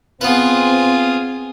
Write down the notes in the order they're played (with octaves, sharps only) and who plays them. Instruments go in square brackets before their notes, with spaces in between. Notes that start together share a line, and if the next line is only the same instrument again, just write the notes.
[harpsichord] B3 B4 [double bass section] C4 [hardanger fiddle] F4 G#4